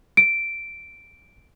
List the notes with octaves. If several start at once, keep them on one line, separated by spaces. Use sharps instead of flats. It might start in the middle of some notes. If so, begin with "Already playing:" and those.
D7